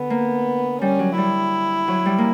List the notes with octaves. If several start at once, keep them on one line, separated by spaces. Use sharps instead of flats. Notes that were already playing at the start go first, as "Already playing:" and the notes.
Already playing: D3 B3
A#3
G3 C#4
F#3
G3 E4
F#3
G3
A#3